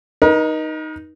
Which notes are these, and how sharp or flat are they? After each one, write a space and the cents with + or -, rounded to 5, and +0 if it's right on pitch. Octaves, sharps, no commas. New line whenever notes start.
D#4 +0 A#4 +45